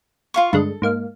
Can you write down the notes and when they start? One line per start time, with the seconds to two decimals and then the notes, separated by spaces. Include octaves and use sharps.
0.34 F4 F5 C#6
0.53 G2 D3 G#3 A4
0.82 G#2 A#3 F5